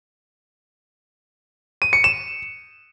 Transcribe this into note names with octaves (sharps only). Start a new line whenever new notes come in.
D#7
C#7
E7